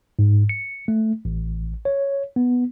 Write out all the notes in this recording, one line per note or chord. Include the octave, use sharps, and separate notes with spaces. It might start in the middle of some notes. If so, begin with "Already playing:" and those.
G#2
C#7
A3
A1
C#5
B3